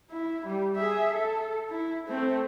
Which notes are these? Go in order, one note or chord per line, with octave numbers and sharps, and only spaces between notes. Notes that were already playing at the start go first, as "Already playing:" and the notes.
E4
G3
G#4 E5
A4
E4
A3 C4